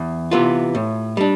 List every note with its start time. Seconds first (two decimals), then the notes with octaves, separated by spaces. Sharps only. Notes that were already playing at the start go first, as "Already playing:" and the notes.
Already playing: E2
0.31 C3 E3 B3 F4
0.75 A2
1.17 G3 D4